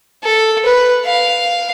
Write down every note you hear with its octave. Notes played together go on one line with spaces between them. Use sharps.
A4
B4
F5